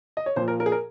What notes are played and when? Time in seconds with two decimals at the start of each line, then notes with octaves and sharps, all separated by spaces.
0.17 D#5
0.26 C#5
0.36 A#2 F3 C5
0.48 A#4
0.60 A#4
0.66 G#4
0.72 A#4